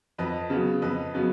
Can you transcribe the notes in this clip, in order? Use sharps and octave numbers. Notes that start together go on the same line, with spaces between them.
F2 B4 D#5
C#3 F#3 B3
F2 B4 D#5
C#3 F#3 B3